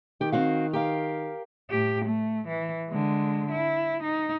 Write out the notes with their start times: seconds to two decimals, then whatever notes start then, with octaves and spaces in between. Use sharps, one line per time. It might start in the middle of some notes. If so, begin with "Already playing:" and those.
0.21 D#3 G4
0.32 C4 F#4 F5
0.73 G4 A#4 F5
1.71 A2 G4
2.05 A3
2.48 E3
2.89 D3 G#3
3.51 E4
4.03 D#4